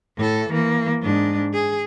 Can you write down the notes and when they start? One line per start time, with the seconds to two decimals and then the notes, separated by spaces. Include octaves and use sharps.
0.17 A2 A4
0.49 E3 A#3
1.02 G#2 D4
1.54 G#4